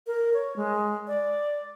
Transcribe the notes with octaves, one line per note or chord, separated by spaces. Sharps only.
A#4
C#5
G#3
D5